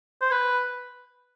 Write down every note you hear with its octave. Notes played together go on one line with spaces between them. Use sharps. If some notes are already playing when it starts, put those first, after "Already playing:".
C5
B4